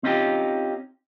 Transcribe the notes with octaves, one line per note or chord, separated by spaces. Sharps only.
C4 C#4 D#4 F4 G4